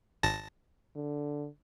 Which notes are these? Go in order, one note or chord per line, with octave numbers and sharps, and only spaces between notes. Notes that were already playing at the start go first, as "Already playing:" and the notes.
G#1 A5 A#6
D3